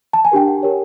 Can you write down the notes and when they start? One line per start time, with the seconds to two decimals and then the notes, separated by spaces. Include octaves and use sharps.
0.13 A5
0.25 G#5
0.32 D4 G4 A#4 G5
0.48 F#5
0.63 G4 A#4 C#5